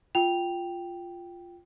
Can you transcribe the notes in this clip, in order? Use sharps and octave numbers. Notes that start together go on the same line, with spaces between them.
F4 G5 F7